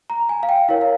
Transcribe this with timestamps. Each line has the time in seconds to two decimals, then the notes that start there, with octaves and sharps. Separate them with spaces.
0.10 A#5
0.29 G#5
0.43 F5
0.49 G5
0.69 E4 A#4 C#5 F5
0.81 F5